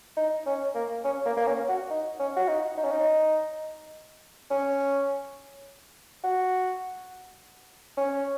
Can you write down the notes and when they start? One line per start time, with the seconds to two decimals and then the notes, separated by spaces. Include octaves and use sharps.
0.17 D#4
0.46 C#4
0.75 A#3
1.04 C#4
1.25 A#3
1.37 A#3
1.47 C#4
1.69 F#4
1.90 D#4
2.19 C#4
2.36 F#4
2.48 D#4
2.77 D#4
2.84 C#4
2.91 D#4
4.51 C#4
6.24 F#4
7.97 C#4